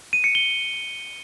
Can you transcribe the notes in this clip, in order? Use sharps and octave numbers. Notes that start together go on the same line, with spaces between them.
D#7
C#7
G7